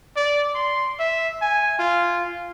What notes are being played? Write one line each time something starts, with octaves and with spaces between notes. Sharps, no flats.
D5
C6
E5
G#5
F4